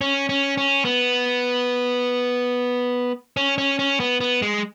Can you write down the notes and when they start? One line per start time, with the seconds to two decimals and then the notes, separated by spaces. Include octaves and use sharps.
0.01 C#4
0.29 C#4
0.57 C#4
0.85 B3
3.37 C#4
3.58 C#4
3.79 C#4
4.00 B3
4.21 B3
4.42 G#3